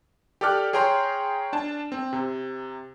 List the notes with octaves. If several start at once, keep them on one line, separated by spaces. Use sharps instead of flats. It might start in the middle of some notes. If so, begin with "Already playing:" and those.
G4 A4 D5 D6 F6 F#6
G#4 C#5 G5 A#5 C6
D4 A5
C4
C3